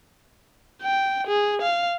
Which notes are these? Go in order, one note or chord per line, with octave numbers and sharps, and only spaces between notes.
G5
G#4
F5